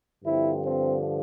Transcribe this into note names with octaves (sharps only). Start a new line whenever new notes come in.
G2 D3 F3 C4 E4
C4